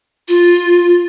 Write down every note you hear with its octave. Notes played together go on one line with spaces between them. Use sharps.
F4